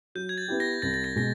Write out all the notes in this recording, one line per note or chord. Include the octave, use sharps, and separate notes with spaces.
F#3 G6
G#6
A6
B3 E4 G4
A#6
C2 A6
A6
A#6
B2 G#3 A#6